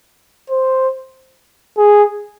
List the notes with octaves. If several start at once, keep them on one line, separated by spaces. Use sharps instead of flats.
C5
G#4